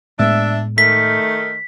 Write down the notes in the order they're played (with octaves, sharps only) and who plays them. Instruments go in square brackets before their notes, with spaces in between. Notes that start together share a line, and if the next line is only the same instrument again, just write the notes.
[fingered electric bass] A2 G#3 B3 [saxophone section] D4 E5
[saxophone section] D#3 A3 [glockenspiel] B6